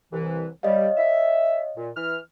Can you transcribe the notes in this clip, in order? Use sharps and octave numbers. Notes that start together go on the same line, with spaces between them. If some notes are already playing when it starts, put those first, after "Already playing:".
C2 E3
G3 C#5 D#5 F5
E5
A#2
E3 F6